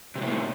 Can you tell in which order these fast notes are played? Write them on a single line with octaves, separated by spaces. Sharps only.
C3 G3 A2